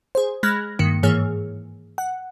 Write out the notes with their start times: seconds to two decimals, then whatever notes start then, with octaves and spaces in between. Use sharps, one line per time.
0.15 G#4 C5
0.43 G#3 B5 F6 F#6 G#6 A#6
0.79 G2 D#3 A#3 C#7
1.03 G#2 E3 A#3 G#4 C#5 F6
1.98 F#5